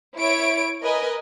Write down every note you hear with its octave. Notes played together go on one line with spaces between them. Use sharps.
E4 C#5 D7
A#4 B4 D#5 G#5